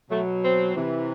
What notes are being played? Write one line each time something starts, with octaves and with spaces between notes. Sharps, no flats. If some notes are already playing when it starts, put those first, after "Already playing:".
B2 F#3 A3
C4
C3 E3